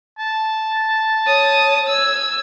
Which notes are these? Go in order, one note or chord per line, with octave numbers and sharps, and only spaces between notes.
A5
C#5 D#6
E6 G#6